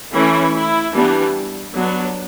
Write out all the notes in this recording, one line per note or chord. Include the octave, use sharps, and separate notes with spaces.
E3 A3 C#4 E4
E4
E3 G3 B3 D4
F#3 B3 D4